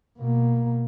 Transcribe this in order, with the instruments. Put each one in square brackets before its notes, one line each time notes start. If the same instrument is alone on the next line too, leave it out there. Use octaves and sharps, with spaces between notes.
[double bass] B2 A#3